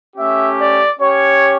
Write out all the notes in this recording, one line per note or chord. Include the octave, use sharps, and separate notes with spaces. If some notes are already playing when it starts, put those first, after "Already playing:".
A3 C#4 G4 E5
D5
C#4 G4 C#5